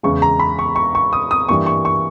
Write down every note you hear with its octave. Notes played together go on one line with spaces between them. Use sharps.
E2 C#3 E3 G#3 C#6
A#5
B5
C#6
C#6
C#6
D#6
D#6
G2 E3 G3 A#3 C#6
C#6
C#6